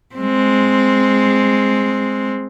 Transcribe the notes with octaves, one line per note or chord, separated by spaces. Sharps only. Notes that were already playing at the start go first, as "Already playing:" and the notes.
G#3 C4